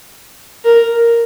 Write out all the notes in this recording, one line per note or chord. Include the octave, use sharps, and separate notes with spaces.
A#4